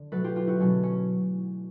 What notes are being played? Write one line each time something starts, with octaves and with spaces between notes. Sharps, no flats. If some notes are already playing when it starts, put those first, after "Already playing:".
Already playing: D3
B2 F#3 A3 A4 B4
F4 G4
F4 G4
E4 F#4
B2 F#3 A3 C#4
C#4